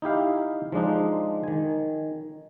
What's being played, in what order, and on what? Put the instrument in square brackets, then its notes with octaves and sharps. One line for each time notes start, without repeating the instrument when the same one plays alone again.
[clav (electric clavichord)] D#4 E4 G4 F5
F3 G#3 D4 D#4
D#3 G#5